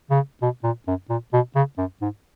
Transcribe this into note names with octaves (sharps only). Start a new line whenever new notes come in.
C#3
B2
A#2
F#2
A#2
B2
C#3
F#2
G#2